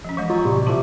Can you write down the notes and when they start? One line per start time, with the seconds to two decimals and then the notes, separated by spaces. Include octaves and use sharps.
0.04 F3 C#4
0.17 E3 G#3 D#5 C#6
0.30 F#3 F4 G#5
0.45 A2 C3 G3
0.66 A#2 F3 A3 E4 F4 A5 D6